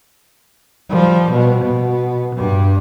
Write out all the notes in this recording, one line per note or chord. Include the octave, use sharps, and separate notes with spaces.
F3 G3
B2
B2
G2 G3